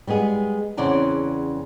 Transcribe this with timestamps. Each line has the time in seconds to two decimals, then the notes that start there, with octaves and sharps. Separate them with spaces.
0.07 G3 G#3 B3 G#4
0.77 E2 C#3 C4 D5 F#5 A5